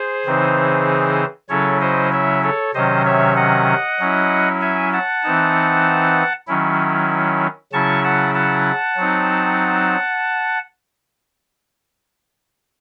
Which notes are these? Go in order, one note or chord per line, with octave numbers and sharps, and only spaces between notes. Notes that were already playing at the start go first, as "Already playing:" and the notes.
Already playing: G#4 C5
C#3 E3 C4 D#4
C#3 F#3 C#4 E4 A4 C#5
C5 D#5
C#5 E5
A4 C#5
C3 D#3 F#3 C#4 C5 D#5
C#5 E5
D#5 F#5
F#3 C#4 E4
E5 G#5
F#5 A5
E3 C4 D#4
D#3 F#3 C#4 E4
C#3 F#3 C#4 E4 A5 C#6
F#5 A5
F#5 A5
F#3 C4 D#4